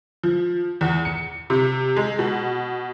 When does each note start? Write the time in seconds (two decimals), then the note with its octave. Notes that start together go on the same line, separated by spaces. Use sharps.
0.23 F3
0.81 E2
1.05 C#7
1.50 C3
1.96 G#3
2.19 B2